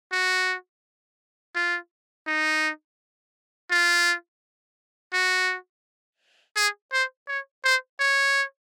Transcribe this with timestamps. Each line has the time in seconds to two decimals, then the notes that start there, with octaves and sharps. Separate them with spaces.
0.12 F#4
1.56 F4
2.27 D#4
3.71 F4
5.13 F#4
6.56 G#4
6.93 C5
7.28 C#5
7.65 C5
8.00 C#5